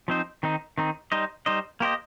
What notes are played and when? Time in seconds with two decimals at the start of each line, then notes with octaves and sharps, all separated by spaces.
0.08 F3 C4 D#4 C5
0.43 D#3 C4 D#4
0.78 D#3 C4 D#4
1.12 G3 D#4 C5 D#5
1.46 G3 D#4 C5 D#5
1.80 A#3 G4 C5 D#5